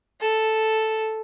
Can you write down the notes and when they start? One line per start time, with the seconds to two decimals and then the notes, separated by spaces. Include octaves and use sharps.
0.21 A4